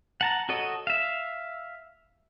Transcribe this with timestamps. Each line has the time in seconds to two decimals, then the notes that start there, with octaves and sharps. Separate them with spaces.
0.21 F#5 A5 A#5
0.49 F#4 A4 C#5 D#5
0.87 E5 F5